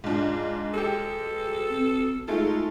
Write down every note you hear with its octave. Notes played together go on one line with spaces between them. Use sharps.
G#2 D4 F4
G#3 G4 A4
C4
G#3 A3 D#4 F4 A4